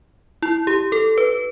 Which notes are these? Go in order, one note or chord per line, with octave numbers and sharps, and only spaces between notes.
E4
G4
A4
B4